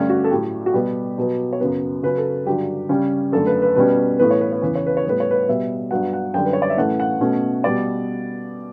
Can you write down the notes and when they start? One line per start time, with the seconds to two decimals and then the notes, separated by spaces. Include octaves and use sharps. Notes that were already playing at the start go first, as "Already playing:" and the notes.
Already playing: G2 D3 A3 C#4 G4
0.10 F#4
0.24 A4
0.31 A2 F#3 A3 G4
0.66 F#4
0.74 B2 G3 B3 G4
1.18 B2 F#3 B3
1.53 C#5
1.60 F#2 C#3 F#3 B3 B4
2.03 C#3 F#3 C#4 B4
2.17 A4
2.46 G2 D3 F#3 G4
2.89 C#3 G3 C#4
3.32 F#2 D3 A3 A4
3.47 B4
3.62 B4
3.75 B2 G3 C#4 B4
4.18 A2 E3 B3 B4
4.31 C#5
4.41 B4
4.53 C#5
4.62 E2 C#3 E3 B4
4.75 C#5
4.86 B4
4.97 C#5
5.05 A2 G3 B3 B4
5.20 C#5
5.31 B4
5.48 B2 G3 B3 E5
5.91 G2 F#3 B3 F#5
6.13 F#5
6.34 F#2 D3 G3 G5
6.45 B4
6.53 C#5
6.62 D5
6.70 E5
6.77 A2 E3 A3 C#4 F#5
7.00 F#5
7.21 B2 A3 C#4
7.64 B2 G3 B3 D5